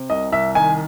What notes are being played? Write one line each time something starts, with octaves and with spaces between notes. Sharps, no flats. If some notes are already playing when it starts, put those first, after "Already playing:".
Already playing: C3
C2 D#5
C2 E5
D#3 G#5